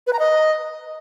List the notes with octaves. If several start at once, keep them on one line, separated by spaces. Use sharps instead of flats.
B4
A#5
D#5